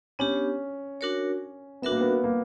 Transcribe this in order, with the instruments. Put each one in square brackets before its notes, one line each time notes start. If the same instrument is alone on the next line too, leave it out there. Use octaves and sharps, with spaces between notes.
[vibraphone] B3 D4 G4 [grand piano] C#4
[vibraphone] D4 F#4 A#4 C#5
[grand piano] B3 [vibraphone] D4 F#4 A#4 E5
[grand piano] A#3
B3
A#3